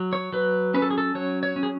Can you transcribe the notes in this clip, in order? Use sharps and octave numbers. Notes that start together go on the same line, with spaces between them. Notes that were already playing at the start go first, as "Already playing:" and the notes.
Already playing: F#3
C#5
F#3 B4
C#4 B4
A4
G#4
A4
F#3 C#5
C#5
C#4
G#4